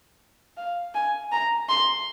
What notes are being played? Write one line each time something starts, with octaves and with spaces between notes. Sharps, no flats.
F5
G#5
A#5
C6